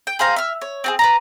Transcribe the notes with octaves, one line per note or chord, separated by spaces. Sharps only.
G5
G#4 C5 F5 A#5
E5 F6
C#5
C4 F#4 G#4
B4 D5 A#5